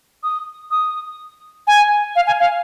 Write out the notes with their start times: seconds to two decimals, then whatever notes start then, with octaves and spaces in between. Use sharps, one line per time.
0.23 D#6
0.71 D#6
1.67 G#5
2.16 F5
2.27 G#5
2.40 F5